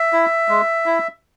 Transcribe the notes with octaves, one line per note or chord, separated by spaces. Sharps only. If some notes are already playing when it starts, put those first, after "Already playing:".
Already playing: E5
E4
G#3
E4